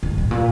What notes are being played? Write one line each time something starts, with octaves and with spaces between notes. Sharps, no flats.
G#2
A2
A#2